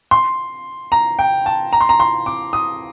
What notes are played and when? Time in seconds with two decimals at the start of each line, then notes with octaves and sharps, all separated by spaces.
0.11 C6
0.92 A#5
1.19 G5
1.46 A5
1.73 A#5
1.81 C6
1.89 A#5
2.00 C6
2.26 D6
2.53 D#6